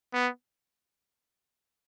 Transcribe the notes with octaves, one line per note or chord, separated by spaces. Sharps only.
B3